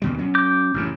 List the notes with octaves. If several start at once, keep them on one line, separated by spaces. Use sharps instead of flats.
D#2 B2 G3
F#3 C#4
D6 G6
A1 F#2 C#3